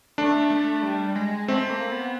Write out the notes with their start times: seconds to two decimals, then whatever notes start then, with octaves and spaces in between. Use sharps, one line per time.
0.18 A3 D4
0.50 A3
0.83 G3
1.16 G#3
1.48 A3 C4
1.70 A#3
1.92 B3